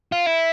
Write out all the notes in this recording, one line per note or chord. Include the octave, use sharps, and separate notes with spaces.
F4
E4